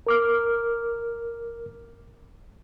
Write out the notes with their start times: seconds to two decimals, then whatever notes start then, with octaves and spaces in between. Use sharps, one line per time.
0.07 A#4 D6 F6